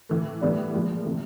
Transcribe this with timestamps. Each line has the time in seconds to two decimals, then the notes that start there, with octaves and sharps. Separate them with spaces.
0.09 A2 E3 A3
0.41 A2 E3 G3 B3 D4
0.73 A#2 F3 G#3
1.04 C3 E3 A3